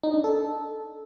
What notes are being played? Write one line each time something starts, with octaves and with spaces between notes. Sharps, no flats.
D#4
D4
A4